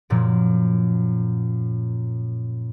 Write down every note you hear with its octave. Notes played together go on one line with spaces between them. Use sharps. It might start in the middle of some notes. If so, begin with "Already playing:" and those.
F#2 A#2 F3